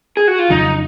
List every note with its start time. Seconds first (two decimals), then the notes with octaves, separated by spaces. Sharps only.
0.17 G#4
0.28 F#4
0.39 F4
0.50 F2 C#3 F#3 D#4